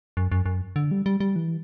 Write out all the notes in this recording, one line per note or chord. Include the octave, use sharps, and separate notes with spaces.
F#2
F#2
F#2
D3
G3
G3
G3
E3